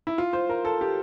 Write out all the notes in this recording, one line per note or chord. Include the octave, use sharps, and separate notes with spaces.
E4
F4
C5
A#4
A4
G4